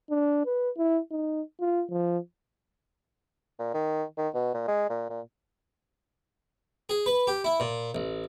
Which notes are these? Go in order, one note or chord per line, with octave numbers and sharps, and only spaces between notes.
D4
B4
E4
D#4
F4
F3
A#2
D#3
D#3
B2
A#2
G#3
A#2
A#2
G#4
B4
G4
E4
A#2
A1